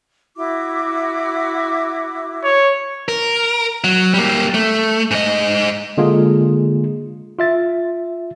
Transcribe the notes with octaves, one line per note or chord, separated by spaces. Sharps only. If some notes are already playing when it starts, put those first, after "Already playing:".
E4 F#4 D6
C#5
A#4
F#3
G3 A#3
A3
G#2 D#5
D3 G#3 A#3 F4 G#4
F4 E5 A6